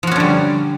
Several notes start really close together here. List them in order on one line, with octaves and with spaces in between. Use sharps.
F3 F#4 C#4 D3 G3